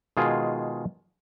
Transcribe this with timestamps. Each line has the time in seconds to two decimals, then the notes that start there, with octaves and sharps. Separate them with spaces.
0.17 B2 D#3 G#3 F4 G#4